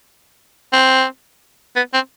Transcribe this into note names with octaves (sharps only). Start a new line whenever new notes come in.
C4
B3
C4